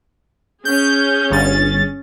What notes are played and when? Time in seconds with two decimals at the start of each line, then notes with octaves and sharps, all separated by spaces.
0.65 C#4 G#4 G6
1.30 G1 A6